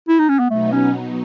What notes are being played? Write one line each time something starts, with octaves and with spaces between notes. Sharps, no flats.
E4
D#4
C#4
B3
B2 F#3 A3 B3 D#4
C#4